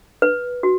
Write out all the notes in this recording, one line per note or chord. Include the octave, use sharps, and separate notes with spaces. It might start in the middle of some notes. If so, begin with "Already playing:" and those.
B4
F#4